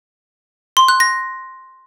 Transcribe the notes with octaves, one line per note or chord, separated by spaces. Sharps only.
C6
F#6
A#6